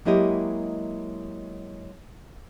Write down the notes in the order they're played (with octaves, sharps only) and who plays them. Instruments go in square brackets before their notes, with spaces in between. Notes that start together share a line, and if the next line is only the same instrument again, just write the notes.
[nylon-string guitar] F#3 G#3 A#3 E4 G4 D#5